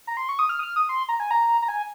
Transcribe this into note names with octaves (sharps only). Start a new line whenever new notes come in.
A#5
C6
C#6
D#6
F6
D#6
F6
D#6
C6
A#5
G#5
A#5
A#5
G#5